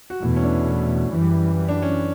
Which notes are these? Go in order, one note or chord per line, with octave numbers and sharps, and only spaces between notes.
F#4
E2 B2 A3 E4
C#4
D4
F#2 E3 G3
D4
C#4